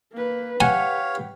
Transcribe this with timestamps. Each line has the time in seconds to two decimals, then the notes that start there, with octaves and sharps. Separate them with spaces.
0.13 A#3 B4
0.61 G4 B4 C#5 F5 F#5 G#5